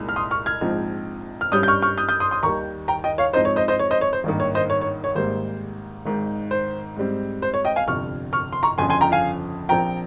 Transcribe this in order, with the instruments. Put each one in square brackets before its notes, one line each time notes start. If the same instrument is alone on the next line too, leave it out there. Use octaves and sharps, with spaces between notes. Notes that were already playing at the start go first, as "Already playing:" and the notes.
Already playing: [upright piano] C2 A#2 G#3 D#4
F6
C6 D#6
C#6 F6
F6 G#6
A#1 G#2 F3 C4 D#4
F6
G2 G3 C#4 D#6 G6
G6
C#6 F6
C#6 F6
D#6 G6
D#6 G6
C6 D#6
C6 D#6
D#2 D#3 G3 A#5 C#6
G5 A#5
D#5 G5
C#5 F5
G#2 F3 C4 D#4 C5 D#5
C#5
C5 D#5
C5 D#5
C#5
C5 D#5
C#5
C5
G#1 G2 D#3 A#3
C#5
C5 D#5
C#5
C#5
C#5
G#1 G#2 G3 A#3 C5
G#1 G#2 D#3
C5
G#2 G3 C4
C5
C#5
D#5 G5
F5 G#5
G1 F2 C3 C#6 F6
C#6 F6
C6
A#5 C#6
G1 F2 C#3 F3 G#5 C6
G#5 C6
G5 A#5
F5 G#5
A#1 A#2 F3 C4 G5 A#5